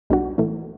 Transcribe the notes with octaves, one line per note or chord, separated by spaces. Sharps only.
B1 B2 G3 D4 F#4
A2 E3 A3